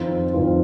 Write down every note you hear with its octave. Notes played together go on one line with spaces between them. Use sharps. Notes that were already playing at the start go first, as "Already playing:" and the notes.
Already playing: F2 D#3 C4 F4
F2 D#3 C4 F4